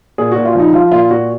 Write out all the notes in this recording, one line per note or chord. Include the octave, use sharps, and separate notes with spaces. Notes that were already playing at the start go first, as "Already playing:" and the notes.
A#2 G#4
A#2 F#4
F4
F3 D#4
F3 F4
A#2 F4
A#2 F#4